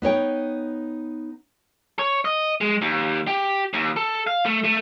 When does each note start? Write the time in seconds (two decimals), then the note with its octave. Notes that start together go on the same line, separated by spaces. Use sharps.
0.02 B3 D#4 C#5 G5
1.99 C#5
2.25 D#5
2.61 G#3
2.81 D#2
3.27 G4
3.73 D#2
3.96 A4
4.27 F5
4.46 A3
4.64 A3